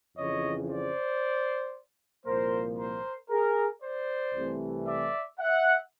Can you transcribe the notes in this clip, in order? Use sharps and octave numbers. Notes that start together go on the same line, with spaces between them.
F2 C#3 E3 C#5 D#5
C5 D5
C2 A#2 F3 A#3 A#4 C5
A#4 C5
G#4 A#4
C5 D5
C2 C3 E3 A3
D5 E5
E5 F#5